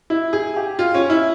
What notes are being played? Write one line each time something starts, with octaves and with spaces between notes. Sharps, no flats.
E4
G#4
G4
F4
C#4
E4